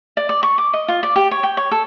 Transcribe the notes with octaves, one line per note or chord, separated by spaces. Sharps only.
D5
D5
C#6
D6
D#5
F4
D5
G4
C#5
G5
C#5
A4